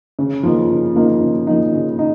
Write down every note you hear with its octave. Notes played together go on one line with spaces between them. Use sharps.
C#3
F3 A#3 D#4
C#3
F3 A#3 D#4
C#3
F3 A#3 D#4
C#3
D#4